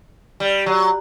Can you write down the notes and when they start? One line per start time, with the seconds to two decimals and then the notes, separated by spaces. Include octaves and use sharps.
0.40 G3
0.66 F#3